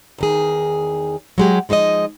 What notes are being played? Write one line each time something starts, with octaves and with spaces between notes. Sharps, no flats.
E2 D#3 G#4
F#3 G#3 G4
F3 G#3 D#4 C5 D#5